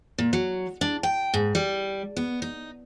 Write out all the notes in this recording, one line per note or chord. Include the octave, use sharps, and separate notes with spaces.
A#2
F#3
D4
G5
G#2
G3
B3
D#4